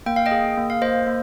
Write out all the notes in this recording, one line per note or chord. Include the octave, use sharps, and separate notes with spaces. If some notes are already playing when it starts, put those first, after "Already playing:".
A#3 G5
F5
D#5 G5
G#4
A#3
F5
A#3 C5 D#5
A#3